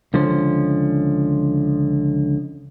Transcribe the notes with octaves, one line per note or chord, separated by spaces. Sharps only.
C#2 D3 F3 C#4 C5